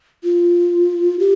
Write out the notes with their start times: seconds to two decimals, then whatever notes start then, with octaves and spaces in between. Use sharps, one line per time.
0.24 F4
1.19 G4